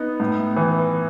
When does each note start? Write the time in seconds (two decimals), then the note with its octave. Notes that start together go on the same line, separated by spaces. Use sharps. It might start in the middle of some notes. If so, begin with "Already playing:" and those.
Already playing: B3 D#4
0.20 A2
0.57 E3